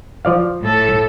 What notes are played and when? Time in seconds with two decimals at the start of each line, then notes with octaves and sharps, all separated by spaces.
0.25 F3 D5 F5
0.61 A2 A4